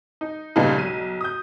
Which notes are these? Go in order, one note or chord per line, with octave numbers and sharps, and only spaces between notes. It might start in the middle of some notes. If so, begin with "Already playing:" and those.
D#4
G2 A#2 C#3 B3 D#4 F4
B1 D#7
D#6 G6